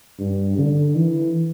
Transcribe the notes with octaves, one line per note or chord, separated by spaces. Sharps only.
G2
D3
E3